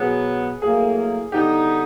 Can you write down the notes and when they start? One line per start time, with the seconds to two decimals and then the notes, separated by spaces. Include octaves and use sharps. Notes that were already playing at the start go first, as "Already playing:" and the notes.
Already playing: B2 F#3 B3 G#4
0.62 A2 F#3 A#3 G#4
1.32 D3 G3 B3 D#4 G4